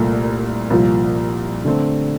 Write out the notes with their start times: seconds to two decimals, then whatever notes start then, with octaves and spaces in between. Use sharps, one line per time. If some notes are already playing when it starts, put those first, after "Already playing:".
Already playing: C2 A#2 A3
0.70 C2 A#2 F3
1.65 D3 A3 C4